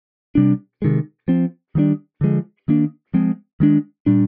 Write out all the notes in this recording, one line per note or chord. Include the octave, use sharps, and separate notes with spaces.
C3 G3 D4
C3 D#3 G#3
F3 C4
D#3 G3 A#3 D4
D3 F3 G#3
D#3 A#3 D4
F3 G#3 C4
D#3 G#3 D4
A#2 G3 D4